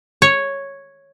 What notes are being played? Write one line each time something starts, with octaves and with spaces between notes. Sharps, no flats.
C#5